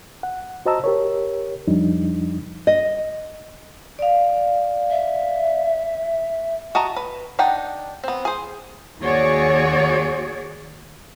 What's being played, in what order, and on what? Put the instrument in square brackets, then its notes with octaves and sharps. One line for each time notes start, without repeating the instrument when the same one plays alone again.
[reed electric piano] F#5
F#4 C5 D#5 A5 A#5 E6
G4 A#4 C#5
F2 F3 G3 D4 D#4
[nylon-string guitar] D#5
[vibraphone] D5 F5
[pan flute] E5
[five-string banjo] F#4 D#5 A5 A#5
B4
D4 D#4 F#5 G5
B3 C4
G#4 C5
[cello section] D#2 F#4 G#4 C#5 D5